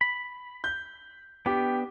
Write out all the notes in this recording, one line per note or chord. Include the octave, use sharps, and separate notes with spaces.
B5
G6
B3 D4 G4